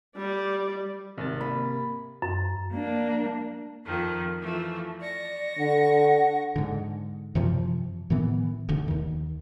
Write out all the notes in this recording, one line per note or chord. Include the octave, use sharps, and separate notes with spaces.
G3 D5
G#1 C3 A#4 A6
A#3 B5
F#2
A#3 D4
F2 D#3 F3
E3 F3 A3
D5 C#6 A#6
D3 F#5
G#2 D3
F#2 C3 E3 F3
A2 D#3 E3 B3
D#1 D2 D3
D#2 D#3